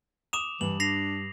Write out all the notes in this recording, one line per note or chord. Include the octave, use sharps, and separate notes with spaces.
D6 D#6 E7 F7
G2 E3 F#7
D4 A#6 C7 F7